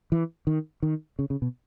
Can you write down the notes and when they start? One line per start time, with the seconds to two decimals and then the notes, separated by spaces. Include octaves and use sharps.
0.12 E3
0.47 D#3
0.83 D#3
1.19 C#3
1.30 C#3
1.42 B2